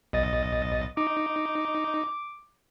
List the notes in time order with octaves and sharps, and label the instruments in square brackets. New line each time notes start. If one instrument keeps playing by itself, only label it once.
[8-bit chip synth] B1 D#5 A6
[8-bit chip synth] D#4 [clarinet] D6